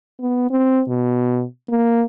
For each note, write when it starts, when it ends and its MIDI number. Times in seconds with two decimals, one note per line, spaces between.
0.20 0.48 59
0.51 0.82 60
0.88 1.44 47
1.69 2.03 58